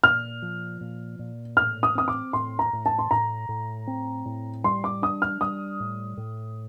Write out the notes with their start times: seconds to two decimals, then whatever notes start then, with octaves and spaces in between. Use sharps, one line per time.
0.04 A#2 F6
0.42 F3
0.81 A#2
1.19 A#2
1.57 A2 F6
1.83 D#6
1.95 C4 D#6
2.08 D6
2.33 A2 C6
2.59 A#5
2.73 A2
2.86 A5
2.99 C6
3.11 A2 A#5
3.49 A2
3.87 C4
4.25 A2
4.64 G3 C6
4.84 D6
5.02 D4 D#6
5.22 F6
5.41 G3 D#6
5.80 A2
6.17 A2